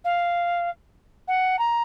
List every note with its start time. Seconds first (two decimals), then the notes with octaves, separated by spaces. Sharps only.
0.05 F5
1.28 F#5
1.59 A#5